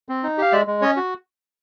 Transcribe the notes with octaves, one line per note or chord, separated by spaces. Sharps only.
C4
D#4
G4 F5
G#3 D5 E5
G#3
C#4 C#5 D#5
F#4